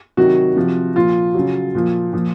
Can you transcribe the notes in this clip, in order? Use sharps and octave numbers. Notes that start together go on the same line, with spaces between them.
C3 D#3 F#3 F#4
C3 F3
A#2 F3 F4
C#3 F#3
A#2 F3
A#2 F3